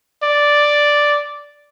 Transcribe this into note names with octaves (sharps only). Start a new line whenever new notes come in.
D5